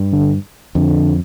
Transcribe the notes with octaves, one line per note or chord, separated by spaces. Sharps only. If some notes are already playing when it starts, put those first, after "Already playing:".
Already playing: G2
D3
F2 D3